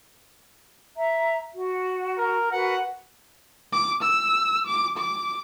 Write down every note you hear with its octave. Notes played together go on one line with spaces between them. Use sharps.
E5 A#5
F#4
A#4
F#4 A#4 B4 F#5
D6
E6
D6
D6